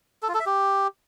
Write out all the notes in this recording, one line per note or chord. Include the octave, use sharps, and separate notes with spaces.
A4
F4
A4
E5
G4